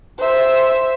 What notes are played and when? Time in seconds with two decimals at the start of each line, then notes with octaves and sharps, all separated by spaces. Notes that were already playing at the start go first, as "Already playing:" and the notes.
0.18 C5 E5